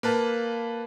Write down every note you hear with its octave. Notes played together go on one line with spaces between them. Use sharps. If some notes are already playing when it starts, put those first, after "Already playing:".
A#3 B4 A5